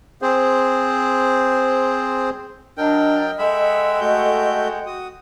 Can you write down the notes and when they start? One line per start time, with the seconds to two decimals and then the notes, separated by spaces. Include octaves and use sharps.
0.22 C4 G#4 C5
2.77 F#3 D4 A#4 D#5 G5
3.38 G#3 A4 E5 F#5 G5 B5
4.01 A3 F#4 G6
4.86 F#4 D#6